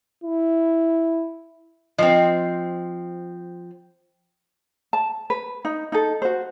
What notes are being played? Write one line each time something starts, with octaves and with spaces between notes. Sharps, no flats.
E4
F3 C4 D#5
A5
B4
D#4
D#4 A4
F#4 C5